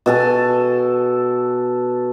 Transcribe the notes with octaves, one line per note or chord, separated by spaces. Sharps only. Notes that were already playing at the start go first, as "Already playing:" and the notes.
B2 A4 G#5